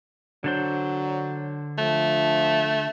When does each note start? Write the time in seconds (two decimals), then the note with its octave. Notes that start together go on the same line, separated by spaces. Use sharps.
0.44 D3 F#3 D4 C5
1.78 F3 A3